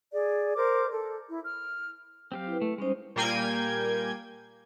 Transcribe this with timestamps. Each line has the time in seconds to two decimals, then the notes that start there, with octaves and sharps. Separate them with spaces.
0.13 G#4 D5
0.56 A#4 C5 D6
0.92 A4
1.30 E4
1.43 F6
2.32 F#3 C4 G4 F5
2.47 E4 B4
2.61 A3
2.78 G3 G#3 C#4 D#4 C5
3.16 A#2 G3 A#3 G5 G#5 G#6